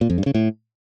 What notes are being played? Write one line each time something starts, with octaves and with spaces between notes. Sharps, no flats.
A#2
F2
G2
C#3
A2